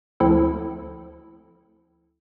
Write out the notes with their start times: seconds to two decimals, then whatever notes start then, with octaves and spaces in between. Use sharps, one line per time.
0.20 D2 F3 C4 E4 A4